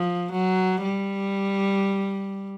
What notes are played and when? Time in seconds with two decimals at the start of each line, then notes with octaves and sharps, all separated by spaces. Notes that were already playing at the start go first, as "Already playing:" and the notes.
Already playing: F3
0.32 F#3
0.84 G3